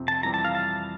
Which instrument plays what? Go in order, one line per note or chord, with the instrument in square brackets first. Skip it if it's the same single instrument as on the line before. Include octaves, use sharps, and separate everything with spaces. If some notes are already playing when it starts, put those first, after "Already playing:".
Already playing: [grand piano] F2 C3 C4
[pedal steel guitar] A5
[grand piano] F2 E3 G3 C4 G4 [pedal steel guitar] A#5
[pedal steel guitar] A5
F5
A5